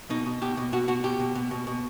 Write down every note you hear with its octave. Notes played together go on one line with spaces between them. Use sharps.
B2 D#4
B2
B2 G4
B2
B2 F#4
B2 F#4
B2 G4
B2
B2
B2
B2